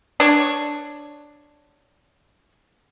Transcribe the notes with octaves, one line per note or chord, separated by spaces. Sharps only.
D4 C#5